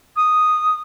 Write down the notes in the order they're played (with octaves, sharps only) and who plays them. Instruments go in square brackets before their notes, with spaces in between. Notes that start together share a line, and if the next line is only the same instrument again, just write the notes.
[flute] D#6